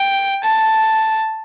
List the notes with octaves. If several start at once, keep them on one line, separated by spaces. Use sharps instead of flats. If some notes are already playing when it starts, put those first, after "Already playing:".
Already playing: G5
A5